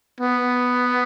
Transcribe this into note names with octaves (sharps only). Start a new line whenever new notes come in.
B3